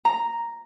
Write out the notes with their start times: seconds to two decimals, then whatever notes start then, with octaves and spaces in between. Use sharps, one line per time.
0.05 A#5